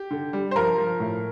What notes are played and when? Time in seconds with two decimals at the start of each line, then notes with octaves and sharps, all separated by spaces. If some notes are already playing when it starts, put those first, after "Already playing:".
Already playing: G4
0.11 D3
0.33 G3
0.51 C5
0.56 F3 A#4
0.78 F3
1.00 A2